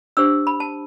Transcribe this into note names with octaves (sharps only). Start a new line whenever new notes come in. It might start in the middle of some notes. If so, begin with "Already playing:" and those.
D4 G4 C5 E6
B5
A5